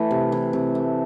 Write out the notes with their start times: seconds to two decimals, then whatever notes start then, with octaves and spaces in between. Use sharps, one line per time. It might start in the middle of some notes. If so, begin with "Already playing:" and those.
Already playing: E3 A3
0.11 C3
0.32 E3
0.53 C3
0.75 A3